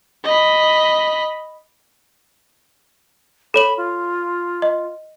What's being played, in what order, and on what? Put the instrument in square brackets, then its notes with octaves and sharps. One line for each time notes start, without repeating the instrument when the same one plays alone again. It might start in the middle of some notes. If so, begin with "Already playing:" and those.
[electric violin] D#5 B5
[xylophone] A4 C#5 F#7 [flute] B5
[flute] F4
[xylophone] D#5